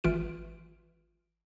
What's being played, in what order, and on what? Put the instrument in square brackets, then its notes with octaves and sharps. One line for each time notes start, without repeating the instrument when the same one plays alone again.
[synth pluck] G#1 E3 F4 D7